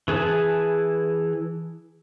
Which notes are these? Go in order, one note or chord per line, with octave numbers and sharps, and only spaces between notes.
E3 G#4 B4 A5